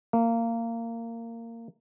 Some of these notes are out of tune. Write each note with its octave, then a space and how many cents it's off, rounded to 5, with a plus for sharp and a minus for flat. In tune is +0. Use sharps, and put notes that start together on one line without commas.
A#3 -20